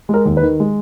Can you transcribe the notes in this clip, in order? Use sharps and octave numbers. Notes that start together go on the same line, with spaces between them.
G#3 A#4
D#2
B4
D#3
G#3